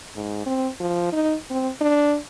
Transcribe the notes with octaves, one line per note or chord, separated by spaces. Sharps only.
G#2
C4
F3
D#4
C4
D4